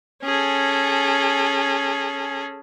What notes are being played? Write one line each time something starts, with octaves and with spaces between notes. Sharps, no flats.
C#4 G#4 A4